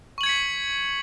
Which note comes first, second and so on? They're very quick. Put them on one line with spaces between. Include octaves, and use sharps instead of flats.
C#6 F#7 G#6 C#7 B6